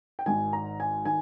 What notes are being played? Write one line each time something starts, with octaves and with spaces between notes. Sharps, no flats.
G5
G#1 G#2 D#3 G#5
A#5
G#5
D#3 G#5